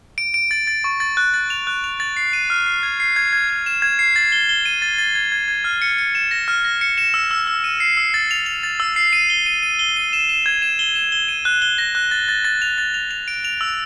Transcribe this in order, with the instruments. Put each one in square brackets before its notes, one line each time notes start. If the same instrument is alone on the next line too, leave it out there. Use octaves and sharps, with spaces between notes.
[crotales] D7
D7
A6
A6
C#6
A6
F#6
A6
F7
F#6
F7
A6
C7
D#7
F6
C7
G#6
C7
G#6
G#6
G#6
E7
G#6
C7
A6
G7
G7
D#7
A6
A6
G#6
G#6
G#6
F6
C#7
C#7
E7
A#6
F6
A#6
C#7
E7
E6
E6
E6
D#7
C7
E6
A6
F7
F7
A6
E6
C7
D#7
G7
D#7
D#7
G7
D#7
E7
E7
G#6
E7
G7
E7
G7
D#7
F#6
G7
A#6
F#6
A6
A6
A6
F7
A6
F7
F7
D7
F7
E6